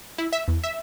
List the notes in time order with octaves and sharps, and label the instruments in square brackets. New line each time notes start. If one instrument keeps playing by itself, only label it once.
[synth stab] E4
E5
E2
E5